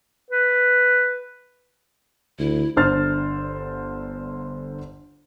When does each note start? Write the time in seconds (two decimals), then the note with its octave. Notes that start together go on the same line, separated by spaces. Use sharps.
0.30 B4
2.38 D2 E4
2.76 G1 D3 C5 F6 A6